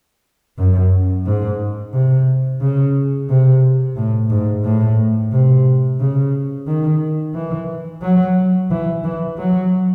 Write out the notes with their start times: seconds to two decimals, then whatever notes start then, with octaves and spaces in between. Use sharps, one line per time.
0.58 F#2
1.26 G#2
1.93 C3
2.61 C#3
3.29 C3
3.96 A2
4.30 G#2
4.64 A2
5.32 C3
6.00 C#3
6.67 D#3
7.34 E3
8.02 F#3
8.71 E3
9.04 E3
9.38 F#3